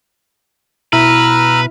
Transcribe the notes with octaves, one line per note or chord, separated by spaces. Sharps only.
B2 E4 B4 A#5 E6 F6